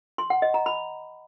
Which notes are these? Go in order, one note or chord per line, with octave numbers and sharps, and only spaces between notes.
C6
F#5
D#5
A#5
B5